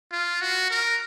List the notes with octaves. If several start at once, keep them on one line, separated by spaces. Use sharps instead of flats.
F4
F#4
A#4